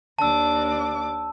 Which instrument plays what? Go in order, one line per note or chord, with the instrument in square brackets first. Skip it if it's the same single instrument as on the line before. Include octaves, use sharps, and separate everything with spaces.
[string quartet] D#2 D4 D6 [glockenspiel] A5 E6